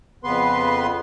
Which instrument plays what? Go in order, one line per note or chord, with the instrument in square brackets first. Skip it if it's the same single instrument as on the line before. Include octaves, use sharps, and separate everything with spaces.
[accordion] F2 C#3 B3 B4 C6